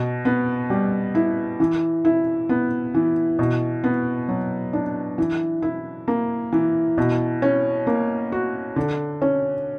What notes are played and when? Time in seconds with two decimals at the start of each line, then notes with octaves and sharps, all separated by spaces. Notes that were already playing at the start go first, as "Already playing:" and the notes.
Already playing: B2
0.25 B3
0.70 G3
1.15 E4
1.60 E3
2.05 E4
2.49 B3
2.94 E3
3.39 B2
3.84 B3
4.28 F#3
4.73 D4
5.18 E3
5.62 E4
6.08 A#3
6.52 E3
6.98 B2
7.42 C#4
7.87 A#3
8.32 F#4
8.76 D3
9.22 C#4